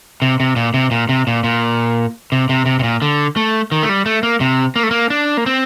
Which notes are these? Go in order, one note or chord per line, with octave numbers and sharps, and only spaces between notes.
C3
C3
A#2
C3
A#2
C3
A#2
A#2
C3
C3
C3
C3
A#2
D3
A3
D#3
A3
G3
A3
A#3
C3
A#3
A3
A#3
D4
A#3
C4